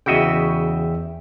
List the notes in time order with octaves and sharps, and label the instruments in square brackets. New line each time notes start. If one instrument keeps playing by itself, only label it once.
[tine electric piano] E2 E5 G5 [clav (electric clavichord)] C#3 F#4 D#5